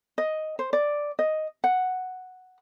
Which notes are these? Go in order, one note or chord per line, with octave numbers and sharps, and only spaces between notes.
D#5
C5
D5
D#5
F#5